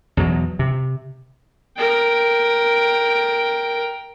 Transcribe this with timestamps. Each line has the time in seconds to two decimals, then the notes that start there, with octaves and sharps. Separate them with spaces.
0.17 E2 B2 F#3
0.59 C3
1.77 A#4 G5